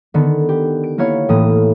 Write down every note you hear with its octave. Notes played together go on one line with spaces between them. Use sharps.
D3 D#3 B3
G4
D7
A#3 B3 E4 C#5 F5
A2 E3 A#3 D#6